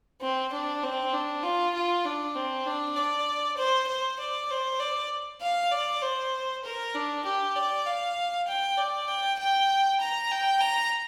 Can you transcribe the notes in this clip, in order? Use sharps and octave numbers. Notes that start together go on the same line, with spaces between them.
C4
D4
C4
D4
F4
F4
D4
C4
D4
D5
C5
C5
D5
C5
D5
F5
D5
C5
A#4
D4
G4
D5
F5
G5
D5
G5
G5
A#5
G5
A#5